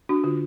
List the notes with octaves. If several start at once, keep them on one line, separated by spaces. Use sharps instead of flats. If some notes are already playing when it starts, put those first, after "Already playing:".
D4 F#4
D3 F4